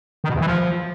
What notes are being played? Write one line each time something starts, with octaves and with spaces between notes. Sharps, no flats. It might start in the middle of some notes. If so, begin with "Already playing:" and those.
D#3
B2
E2
E3
F3